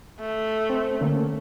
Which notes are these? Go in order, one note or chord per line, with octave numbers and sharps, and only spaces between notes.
A3
C4
D3 A3 A#3 C#4